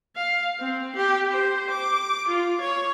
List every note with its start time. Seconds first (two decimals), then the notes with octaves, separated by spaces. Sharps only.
0.16 F5
0.60 C4
0.96 G4
1.30 C5
1.70 D6
2.28 F4
2.61 C#5